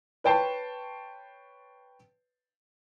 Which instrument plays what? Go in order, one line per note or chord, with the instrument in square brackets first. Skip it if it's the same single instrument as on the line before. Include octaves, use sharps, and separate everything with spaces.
[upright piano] B4 C#5 G5 A5 C6